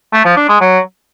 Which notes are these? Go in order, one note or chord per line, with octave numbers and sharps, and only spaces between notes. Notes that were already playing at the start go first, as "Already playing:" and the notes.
A3
F3
D4
G#3
F#3